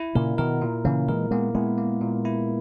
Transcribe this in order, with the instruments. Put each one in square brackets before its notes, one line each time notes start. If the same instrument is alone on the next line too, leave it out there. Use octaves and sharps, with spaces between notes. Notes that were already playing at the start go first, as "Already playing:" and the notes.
Already playing: [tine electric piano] E4
[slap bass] A#2 C#3 [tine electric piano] A#4
[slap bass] B2 D#3 [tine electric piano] A#4
[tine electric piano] A#2
[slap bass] C#3 E3 [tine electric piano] A#3
[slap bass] E3 G#3 [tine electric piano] A#4
[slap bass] G#3 B3 [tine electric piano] A#3
[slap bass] G#3 B3 [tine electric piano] E4
[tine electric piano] A#3
A#2
E4